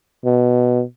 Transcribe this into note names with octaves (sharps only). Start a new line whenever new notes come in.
B2